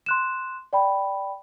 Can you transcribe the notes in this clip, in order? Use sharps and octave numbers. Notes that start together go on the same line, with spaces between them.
C6 F#6 E7
D5 G5 B5